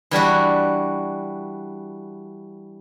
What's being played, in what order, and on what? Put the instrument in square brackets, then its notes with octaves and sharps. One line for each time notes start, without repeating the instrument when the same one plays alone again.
[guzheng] E3 G3 D4 F#4